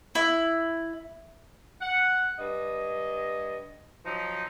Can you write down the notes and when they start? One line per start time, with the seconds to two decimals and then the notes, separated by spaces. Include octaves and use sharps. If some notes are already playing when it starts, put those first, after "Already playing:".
0.15 E4
1.81 F#5
2.39 G2 D#5
4.05 F3 F#3 D#4